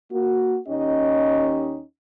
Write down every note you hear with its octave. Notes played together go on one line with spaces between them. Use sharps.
A#3 F#4
D#2 C#4 D#4 G4 D#5